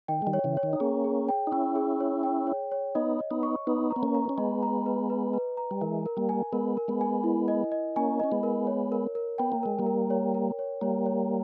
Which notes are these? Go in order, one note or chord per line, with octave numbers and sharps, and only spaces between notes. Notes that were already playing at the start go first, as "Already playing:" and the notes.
D#3 G5
G#3
D#3 G3
C#5
C#3 E3
C#5
D#3
D#4
A#3 C#4 G#4
G#4
G5
D#4
C#4 E4 G5
G#4
C#5
G5
C#5
C#5
B3 D#4 D#5
D#5
B3 D#4
C#6
B3 D#4 B4
A#5
B3
A#3 C#4
A#5
C#4
G#3 B3 D#5
A#5
B4
B4
B4
A#5
G3
E3 G#3 A#4
A#4
G3 A#3
G#5
G#3 B3 A#4
A#4
G#3 B3
G#5
E4
D#5
D#5
A#3 C#4 G#5
C#4 D#5
G#3 B3
A#4
C#5
A#4
A#4
B3 G5
A#3
G#3 A#4
G3 A#3
A#4
C#5
A#4
C#5
G3 A#3 C#5
C#5